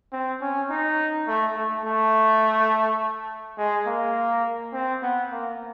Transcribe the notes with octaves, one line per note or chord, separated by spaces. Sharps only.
C4
C#4
D#4
A3
A3
A3
G#3
A#3
C4
B3
A#3